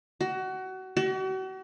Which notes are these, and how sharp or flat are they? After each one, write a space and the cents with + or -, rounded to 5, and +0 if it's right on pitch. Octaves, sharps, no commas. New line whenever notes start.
F#4 +25
F#4 +40